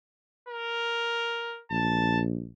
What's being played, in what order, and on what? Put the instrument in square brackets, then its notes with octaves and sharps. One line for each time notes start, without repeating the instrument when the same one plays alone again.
[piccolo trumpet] A#4
[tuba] A#1 [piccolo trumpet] A5